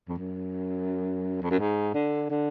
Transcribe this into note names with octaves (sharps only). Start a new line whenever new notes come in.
F2
F#2
F2
F#2
G#2
D3
D3